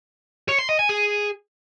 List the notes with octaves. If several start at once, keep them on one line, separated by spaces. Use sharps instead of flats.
C#5
C6
D#5
G#5
G#4